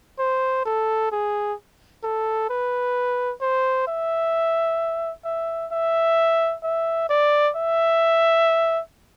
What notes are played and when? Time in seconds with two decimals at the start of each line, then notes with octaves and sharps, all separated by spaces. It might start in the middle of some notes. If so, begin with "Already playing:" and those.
0.19 C5
0.65 A4
1.12 G#4
2.03 A4
2.50 B4
3.41 C5
3.88 E5
5.25 E5
5.72 E5
6.63 E5
7.09 D5
7.56 E5